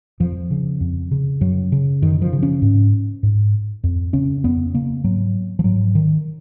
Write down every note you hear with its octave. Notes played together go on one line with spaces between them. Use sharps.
F2 F3
C#3
F2
C#3
F#2 F#3
C#3
F#2 D#3
F3
C#3
C#4
G#2
G#2
F2
C#3 C#4
F2 B3
C#3 A#3
G#2 F#3
F3
G#2 F#3
D#3